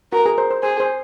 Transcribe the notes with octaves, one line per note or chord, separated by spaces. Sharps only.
F#4 A#4
G#4
C5
C5
G#4 C5
C5